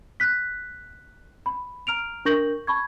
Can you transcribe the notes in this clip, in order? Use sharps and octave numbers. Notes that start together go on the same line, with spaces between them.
F#6 B6
B5
A#5 F6 D7 F7
D4 A#4 C#6 G6 A#6 F#7
A5 B5 C#6 G#6